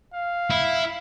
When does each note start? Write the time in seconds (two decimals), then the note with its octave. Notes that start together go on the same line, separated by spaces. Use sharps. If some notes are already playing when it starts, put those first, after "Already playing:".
0.13 F5
0.50 E4